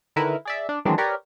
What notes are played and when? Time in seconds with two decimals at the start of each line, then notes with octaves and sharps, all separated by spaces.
0.16 D3 D#3 E4 A#4 B4
0.45 G#4 D5 E5
0.69 D4
0.85 D#3 E3 F#3 G#3 C4 D4
0.98 G4 A#4 B4 C#5 D5